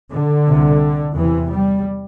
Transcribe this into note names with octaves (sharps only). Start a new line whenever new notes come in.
D3
C2 C3
E2 C3 E3
G3